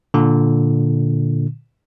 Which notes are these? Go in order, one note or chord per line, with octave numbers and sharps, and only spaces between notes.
A#2 D3